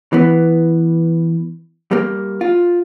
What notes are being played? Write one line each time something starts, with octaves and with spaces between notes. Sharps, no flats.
E3 B3
G3 A#3
F4